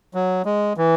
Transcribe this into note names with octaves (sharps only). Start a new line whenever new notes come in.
F#3
G#3
E3